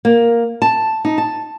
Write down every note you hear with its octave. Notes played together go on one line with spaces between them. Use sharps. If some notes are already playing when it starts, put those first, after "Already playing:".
A#3
A5
D#4
A5